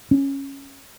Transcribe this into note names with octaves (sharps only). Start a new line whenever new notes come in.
C#4